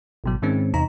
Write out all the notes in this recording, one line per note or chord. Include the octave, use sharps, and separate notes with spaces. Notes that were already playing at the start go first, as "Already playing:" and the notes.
G#1 B2 F#3
G#2 D#3 G#3 C4 C#4
E2 C3 D#4 A#5